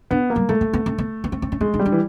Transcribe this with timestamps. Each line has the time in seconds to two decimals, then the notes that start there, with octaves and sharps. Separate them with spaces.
0.11 B3 D4
0.30 A#3
0.36 G3
0.49 G#3 A3
0.61 A#3
0.73 B3
0.86 C4
0.98 B3
1.24 B3
1.32 C4
1.42 C4
1.52 C#4
1.61 G#3 D#4
1.74 D#4
1.79 G3
1.85 D4
1.92 E3